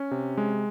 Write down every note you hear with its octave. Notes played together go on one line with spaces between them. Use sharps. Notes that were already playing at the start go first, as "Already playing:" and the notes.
Already playing: C#4
C3
G#3